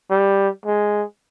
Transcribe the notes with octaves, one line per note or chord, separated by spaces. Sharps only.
G3
G#3